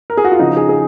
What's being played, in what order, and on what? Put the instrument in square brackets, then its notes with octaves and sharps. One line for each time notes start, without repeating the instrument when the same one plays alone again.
[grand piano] A#4
G#4
F#4
F4
C#3 F3 D#4
G#4
G#4